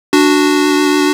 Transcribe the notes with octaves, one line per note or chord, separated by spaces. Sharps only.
D4 F#4